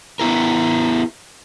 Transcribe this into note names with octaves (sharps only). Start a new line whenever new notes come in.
B3 E4 A#4